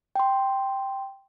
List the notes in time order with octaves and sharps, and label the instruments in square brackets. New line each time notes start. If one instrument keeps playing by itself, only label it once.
[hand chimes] G5 C6